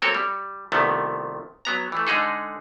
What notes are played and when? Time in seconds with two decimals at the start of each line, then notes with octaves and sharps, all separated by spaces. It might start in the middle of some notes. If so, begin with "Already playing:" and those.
0.02 F#3 A#3 C4 A4 A#4 C#5
0.15 G3
0.72 C2 C3 D#3 F3 A3 B3
1.65 F#3 B3 A#5
1.92 E3 A3
2.07 D3 G#3 D#4 G#4 A4